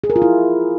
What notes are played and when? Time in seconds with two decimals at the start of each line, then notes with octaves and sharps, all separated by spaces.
0.04 G#4
0.10 A#4
0.16 F4
0.22 E4